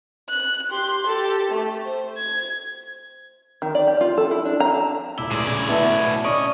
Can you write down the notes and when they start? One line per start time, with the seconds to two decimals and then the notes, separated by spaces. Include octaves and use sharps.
0.30 F#6
0.70 G4 C6
1.06 G4 A4
1.51 A3
1.85 C5
2.18 G#6
3.62 D#3
3.75 D5
3.87 G4
4.01 F4
4.17 A4
4.31 E4
4.45 D4
4.60 A#5
4.74 A5
5.18 D#1 E4 D6 G7
5.31 B1 A2 G#3 D5
5.47 C#3 G#5
5.69 B3 E4 A4 E5
5.85 B2
6.25 C#4 D5 D#5 C#6